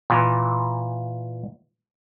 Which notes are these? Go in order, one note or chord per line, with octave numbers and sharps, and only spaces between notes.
A#2 E3